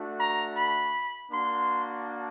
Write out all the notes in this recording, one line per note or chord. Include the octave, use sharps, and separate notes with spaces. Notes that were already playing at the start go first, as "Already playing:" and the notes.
Already playing: A3 D4 F#4
A#5
B5
A#3 D4 F#4 C6